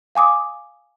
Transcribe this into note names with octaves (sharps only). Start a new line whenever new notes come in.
F5 G#5 D6 D#6